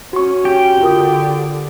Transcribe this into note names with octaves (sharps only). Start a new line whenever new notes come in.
C#4 F#4 C#6
G4
D3 F4 A#4 D#6